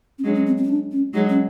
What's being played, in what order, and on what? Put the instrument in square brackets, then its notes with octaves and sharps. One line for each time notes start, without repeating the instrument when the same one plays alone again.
[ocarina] C#4
[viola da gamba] F#3 G#3 [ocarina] D4
[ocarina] C#4
C4
C4
C#4
D4
C#4
[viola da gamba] F#3 G#3 [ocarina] D#4
[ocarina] C#4